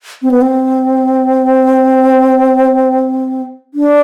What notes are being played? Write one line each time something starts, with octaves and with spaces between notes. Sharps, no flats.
C4
B3
C4
D4